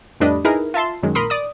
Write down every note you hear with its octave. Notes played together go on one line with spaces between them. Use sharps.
F2 A2 G3 D4 B4 D#5
D#4 E4 G#4 A#4 B4
F4 E5 A5 C6
F#2 D#3 F#3 G#3
A#1 A#4 B5 C6 D#6
D5 D#6